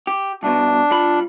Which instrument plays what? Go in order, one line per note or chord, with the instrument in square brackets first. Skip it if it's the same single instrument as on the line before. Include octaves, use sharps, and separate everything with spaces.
[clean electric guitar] G4
[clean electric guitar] C2 B2 [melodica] D4
[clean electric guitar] G3 F4 B5